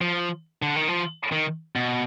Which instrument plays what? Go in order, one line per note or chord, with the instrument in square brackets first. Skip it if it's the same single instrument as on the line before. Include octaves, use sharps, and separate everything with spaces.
[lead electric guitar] F3
D3
D#3
F3
D#3
B2